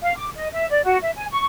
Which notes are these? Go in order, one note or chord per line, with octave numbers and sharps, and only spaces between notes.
F5
D6
D#5
E5
D5
F#4
E5
G#5
C#6